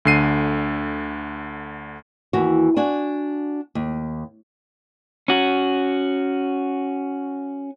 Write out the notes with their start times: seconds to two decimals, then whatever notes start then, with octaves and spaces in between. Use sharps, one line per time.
0.05 D2 D3 C7 D#7
2.33 D#2 E3 F#4
2.77 D4 F#4 G#5
3.75 D#2
5.28 C#4 F#4